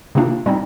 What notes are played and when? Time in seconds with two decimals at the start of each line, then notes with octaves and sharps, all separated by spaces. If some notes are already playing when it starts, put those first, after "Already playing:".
0.15 C3 D#3 A#3 D4 F4
0.46 A#2 G3 C4 D#4